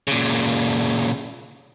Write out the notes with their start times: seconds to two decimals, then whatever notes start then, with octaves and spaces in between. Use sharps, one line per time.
0.08 A#2 C#3